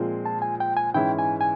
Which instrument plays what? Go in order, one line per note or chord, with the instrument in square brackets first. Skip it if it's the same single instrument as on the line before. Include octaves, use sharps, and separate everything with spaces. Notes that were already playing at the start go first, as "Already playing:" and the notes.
Already playing: [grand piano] A#2 F3 G#3 C4
[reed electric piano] A5
G#5
G5
G#5
[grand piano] G#2 E3 G#3 C#4 E4 [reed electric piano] G5
[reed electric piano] G#5
G#5